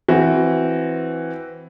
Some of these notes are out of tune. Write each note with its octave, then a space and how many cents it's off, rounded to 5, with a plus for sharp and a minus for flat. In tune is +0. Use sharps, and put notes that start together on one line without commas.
E3 +0 C4 +0 F#4 +10